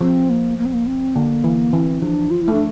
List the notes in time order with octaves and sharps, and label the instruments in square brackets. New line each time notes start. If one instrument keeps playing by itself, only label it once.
[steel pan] F3 [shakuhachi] C4
[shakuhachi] A#3
A#3
C4
A#3
C4
[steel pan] D3 [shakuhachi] A#3
[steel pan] E3
[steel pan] E3 [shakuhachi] C4
[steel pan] F3 [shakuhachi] D4
[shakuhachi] F4
E4
[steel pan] A3 [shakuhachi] D4